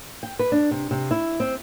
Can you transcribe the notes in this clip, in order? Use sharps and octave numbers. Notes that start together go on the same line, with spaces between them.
G5
B4
D4
C3
C3
E4
C4